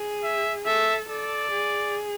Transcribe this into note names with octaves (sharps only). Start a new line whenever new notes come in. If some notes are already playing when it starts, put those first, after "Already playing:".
Already playing: G#4
E5
A4 E5
A4 D5
G#4